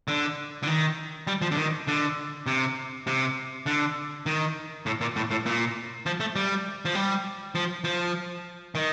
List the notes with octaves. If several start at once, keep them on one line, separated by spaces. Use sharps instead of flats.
D3
D3
D#3
G3
F3
D3
D#3
D3
C3
C3
D3
D#3
A2
A#2
A2
A2
A#2
F3
A3
G3
F3
G3
F3
F3
D#3